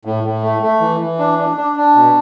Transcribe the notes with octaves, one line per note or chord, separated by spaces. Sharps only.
A2
A2
A3
A3
E3
E3
D4
D4
D4
D4
B2